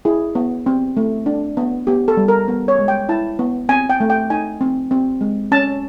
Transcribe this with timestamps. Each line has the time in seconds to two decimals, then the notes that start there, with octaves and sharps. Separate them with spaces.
0.05 E4 G#4
0.35 B3
0.66 C4
0.97 A3
1.26 D4
1.57 B3
1.87 B3 G4
2.08 A4
2.17 G3
2.28 A#4
2.48 B3
2.68 C#5
2.79 G#3
2.88 G5
3.09 E4 A5
3.39 B3
3.69 C4 G#5
3.90 G5
4.00 A3
4.10 G5
4.30 D#4 G#5
4.61 C4
4.91 C4
5.21 G#3
5.52 C#4 A5